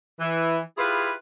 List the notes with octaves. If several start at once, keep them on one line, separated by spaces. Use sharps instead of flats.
E3
E4 F4 G4 G#4 B4